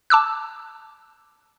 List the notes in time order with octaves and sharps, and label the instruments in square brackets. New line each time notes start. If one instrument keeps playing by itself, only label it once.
[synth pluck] A5 D6 E6 F#6